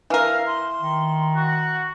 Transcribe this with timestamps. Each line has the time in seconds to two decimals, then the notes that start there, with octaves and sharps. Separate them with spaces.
0.10 E3 A#4 F5
0.46 C6
0.81 D#3
1.36 F#4 F#5